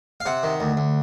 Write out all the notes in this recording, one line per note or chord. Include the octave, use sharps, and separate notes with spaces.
F5
C3 F#5
D#3
D2
D2